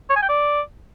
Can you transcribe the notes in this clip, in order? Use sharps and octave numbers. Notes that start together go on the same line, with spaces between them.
C#5
G#5
G5
D5